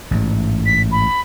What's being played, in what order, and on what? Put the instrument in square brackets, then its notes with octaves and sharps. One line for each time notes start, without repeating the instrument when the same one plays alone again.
[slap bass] A1 G#2
[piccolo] B6
B5